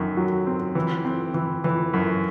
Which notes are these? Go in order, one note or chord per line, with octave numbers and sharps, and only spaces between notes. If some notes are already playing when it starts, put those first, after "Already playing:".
Already playing: F#2 D#3
F#3
C4
E3
C4
E3
E3
F#2